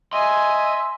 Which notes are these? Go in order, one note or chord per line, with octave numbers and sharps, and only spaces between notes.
D#5 E5 G#5 C6